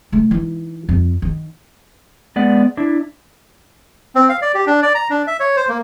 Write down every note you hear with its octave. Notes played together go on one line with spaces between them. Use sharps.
C#3 A3
E3 D#4
F2
D#3
G#3 B3 D5 F#5
D4 E4
C4
F5
D5
G4
D4
D5
A#5
D4
E5
C#5
C5
A#3